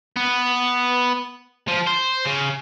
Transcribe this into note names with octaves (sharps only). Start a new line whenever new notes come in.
B3
F3
C5
C#3